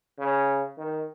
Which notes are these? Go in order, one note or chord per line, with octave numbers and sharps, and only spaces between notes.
C#3
D#3